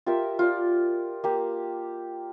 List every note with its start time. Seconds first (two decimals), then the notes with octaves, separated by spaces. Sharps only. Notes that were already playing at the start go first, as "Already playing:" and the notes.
0.06 F4 G4 A#4 E5
0.39 F4 D5
1.24 A#3 G4